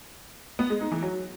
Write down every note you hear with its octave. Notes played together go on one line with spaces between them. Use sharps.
B3
G#3
D#4
E3
F#3